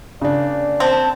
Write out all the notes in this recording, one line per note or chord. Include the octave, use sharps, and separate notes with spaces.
C#3 A#3 D4 C#5 D5
C4 A5